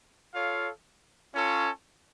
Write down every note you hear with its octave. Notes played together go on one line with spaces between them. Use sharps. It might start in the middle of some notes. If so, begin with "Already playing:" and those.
F4 A4 C#5 F5
C#4 F4 A4 C#5